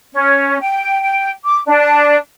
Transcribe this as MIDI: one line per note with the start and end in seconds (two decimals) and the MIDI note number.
0.13 0.58 61
0.60 1.00 79
1.01 1.28 79
1.44 1.59 86
1.66 2.16 62